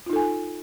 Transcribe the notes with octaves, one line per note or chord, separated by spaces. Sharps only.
D#4 F4 A4 G#5